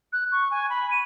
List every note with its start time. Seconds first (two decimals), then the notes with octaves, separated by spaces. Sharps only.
0.13 F#6
0.32 C#6
0.51 G#5
0.70 B5
0.91 D#7